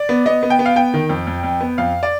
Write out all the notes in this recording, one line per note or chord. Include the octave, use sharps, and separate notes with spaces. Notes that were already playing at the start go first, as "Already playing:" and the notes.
Already playing: D5
B3
B3 D#5
B3
G5
B3
F5
B3 G5
D#3
F2
F2
F2
B3
F2 F5
D5